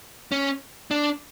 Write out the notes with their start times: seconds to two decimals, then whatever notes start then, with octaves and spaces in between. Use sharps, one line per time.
0.32 C#4
0.91 D4